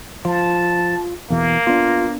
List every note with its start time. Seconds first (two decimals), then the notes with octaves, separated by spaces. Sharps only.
0.25 F3 F4 A5
1.30 E2 B2 E3 A#3
1.67 B3 D4 F4